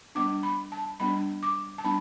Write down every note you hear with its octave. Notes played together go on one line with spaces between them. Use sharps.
G3 B3 D4 D6
B5
A5
G3 B3 D4 B5
D6
A5
G3 B3 D4 B5